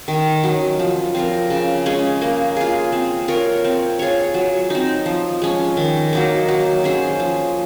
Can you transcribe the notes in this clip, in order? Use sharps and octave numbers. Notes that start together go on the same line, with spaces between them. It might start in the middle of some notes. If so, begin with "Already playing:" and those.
D#3
F#3 C#4
F3
C4 F4 A#4
C#3
G#3 C#4 G#4
A#3
F4 G#4
C4
F4 A#4 C#5
C4
F4 G#4 C#5
F#3
C4 D#4
F3
G#3 C#4
D#3
F#3 A#3 D#4
F#3
C#4 G#4 C5
F3